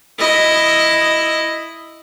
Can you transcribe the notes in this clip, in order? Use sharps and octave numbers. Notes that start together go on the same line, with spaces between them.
E4 D#5